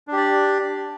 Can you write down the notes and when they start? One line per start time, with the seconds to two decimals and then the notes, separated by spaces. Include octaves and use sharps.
0.08 D4
0.12 G4
0.17 D5